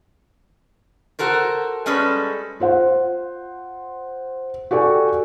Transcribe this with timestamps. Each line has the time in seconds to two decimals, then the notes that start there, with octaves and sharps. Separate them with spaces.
1.19 F#4 A4 A#4 C5
1.86 G3 G#3 C#4 A4 B4
2.60 F4 C5 F#5
4.71 F#4 G4 A4 D5 G#5